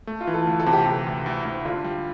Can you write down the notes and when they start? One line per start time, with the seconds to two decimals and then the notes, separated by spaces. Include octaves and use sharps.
0.07 A3
0.20 F4
0.27 E3
0.34 A4
0.47 D2
0.59 A4
0.66 C3
0.73 G4
0.86 C3
1.06 D2
1.26 D2
1.45 D2
1.65 D3 F4
1.84 G3